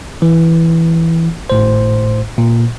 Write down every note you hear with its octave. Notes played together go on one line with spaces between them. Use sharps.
E3
G#1 A2 C5
A#2